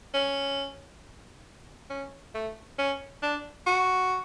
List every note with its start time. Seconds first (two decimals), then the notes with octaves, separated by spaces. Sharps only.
0.14 C#4
1.90 C#4
2.34 A3
2.79 C#4
3.22 D4
3.66 F#4